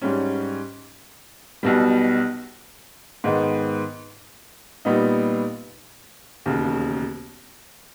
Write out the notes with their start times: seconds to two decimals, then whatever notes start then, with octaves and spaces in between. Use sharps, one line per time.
0.02 G#2 G3 C#4
1.63 B1 B2 G3
3.24 G#2 D#3 G#3 B3
4.85 A#2 G3 B3 D#4
6.46 E1 D#2 C#3